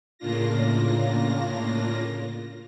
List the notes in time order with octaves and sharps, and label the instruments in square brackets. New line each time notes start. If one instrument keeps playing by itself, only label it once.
[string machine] A2 C#3 A#3 D4 F4 A#6